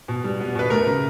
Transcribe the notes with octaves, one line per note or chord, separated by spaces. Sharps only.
B2
G3
B3
B2 B4
A3 A#4
C#3